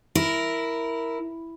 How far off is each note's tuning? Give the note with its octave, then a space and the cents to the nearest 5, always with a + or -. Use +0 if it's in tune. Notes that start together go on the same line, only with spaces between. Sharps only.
E4 +0 A#4 +0